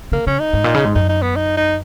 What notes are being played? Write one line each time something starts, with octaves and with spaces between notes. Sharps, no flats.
C#3 A#3
C#3 C#4
D#4
G#2
A#2
C#3
G#2
F#2 D#4
D#4
B3
D#4
D#4